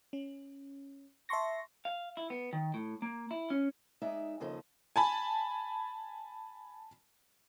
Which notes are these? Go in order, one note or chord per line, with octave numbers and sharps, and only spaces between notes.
C#4
E5 A5 C6 C#6 A#6
F5
E4
B3
D#3
A2
A#3
E4
C#4
G#3 D#4 D5 E5
D#2 C#3 F3 A4 D#5
G#5 A5 B5